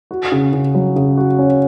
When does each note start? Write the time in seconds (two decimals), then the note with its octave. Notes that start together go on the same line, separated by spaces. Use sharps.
0.11 F#4
0.32 C#3
0.53 C#3
0.75 F#3
0.96 C#3
1.17 F#4
1.39 C#4